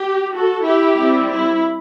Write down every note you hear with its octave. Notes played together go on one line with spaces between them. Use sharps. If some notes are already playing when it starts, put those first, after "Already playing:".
Already playing: G4
F#4 A4
E4 G4
G3 C4 E4
E4